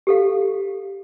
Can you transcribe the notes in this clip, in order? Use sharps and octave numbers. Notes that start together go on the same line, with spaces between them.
G4 A4 F5